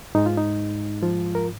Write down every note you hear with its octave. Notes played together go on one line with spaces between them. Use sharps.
G#2 G#3 D#4
F4
D#4
F3 F4
A#4